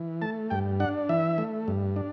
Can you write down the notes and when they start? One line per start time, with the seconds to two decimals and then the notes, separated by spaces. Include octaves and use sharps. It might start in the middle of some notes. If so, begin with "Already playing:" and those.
Already playing: E3
0.22 A3 A5
0.50 G2 G5
0.80 D4 F#5
1.09 E3 E5
1.38 A3
1.68 G2
1.96 D4